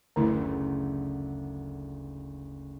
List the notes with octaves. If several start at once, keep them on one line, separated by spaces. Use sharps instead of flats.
F#1 D2 D3 A3 E4